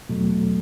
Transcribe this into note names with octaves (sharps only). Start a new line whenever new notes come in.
E2 B2 F#3 A3